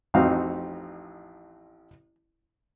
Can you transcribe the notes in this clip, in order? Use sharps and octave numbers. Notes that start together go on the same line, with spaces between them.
A1 F2 C4 D#4 F#4 F5